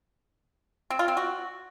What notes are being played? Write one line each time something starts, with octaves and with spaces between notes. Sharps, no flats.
C4
F4
C4
F#4